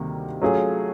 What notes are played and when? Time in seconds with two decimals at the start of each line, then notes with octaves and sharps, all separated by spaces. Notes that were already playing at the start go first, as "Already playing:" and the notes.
Already playing: D2 C3 D#3 G3 A#3
0.42 F#3 A3 C#4 F4 G#4